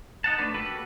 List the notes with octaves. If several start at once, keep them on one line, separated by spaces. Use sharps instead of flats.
D#4 F#5 A5
A3 D4 B4
A#3 F#4 G4 A4 B4